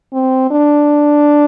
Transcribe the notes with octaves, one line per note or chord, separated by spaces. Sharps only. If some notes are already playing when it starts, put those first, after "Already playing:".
C4
D4